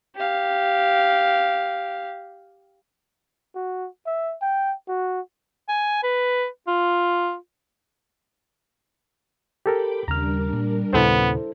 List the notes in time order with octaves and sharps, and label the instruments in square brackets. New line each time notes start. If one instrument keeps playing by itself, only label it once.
[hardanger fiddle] G4 F5
[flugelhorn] F#4
E5
G5
F#4
[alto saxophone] G#5
B4
F4
[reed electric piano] G4 A4 A#4 [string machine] G5 B5 D6
[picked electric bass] D#2 C#3 [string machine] G3 D4 A#4 [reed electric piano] A#5 F6
[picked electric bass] A#2
[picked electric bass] D#2 A#2 C#3 [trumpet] B3 [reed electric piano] E4 A4 C5